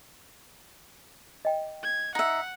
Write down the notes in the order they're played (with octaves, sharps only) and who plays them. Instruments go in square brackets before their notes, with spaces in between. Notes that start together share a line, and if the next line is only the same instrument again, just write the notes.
[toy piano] D#5 G5
[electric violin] G#6
[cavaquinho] D#4 E5 [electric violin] F#5